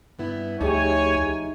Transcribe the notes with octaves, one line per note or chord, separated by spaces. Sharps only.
G2 B3 E4
D2 F3 D#4 G4 G#4 C#5 E5 G#5